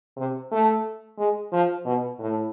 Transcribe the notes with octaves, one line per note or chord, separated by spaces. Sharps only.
C3
A3
G#3
F3
B2
A2